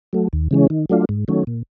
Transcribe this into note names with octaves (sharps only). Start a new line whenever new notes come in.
F#3 A3
D#2
C#3 E3 G#3 C#4
D#3
F#3 A3 D4 F4
G#2
D#3 F#3 A3 C#4
A#2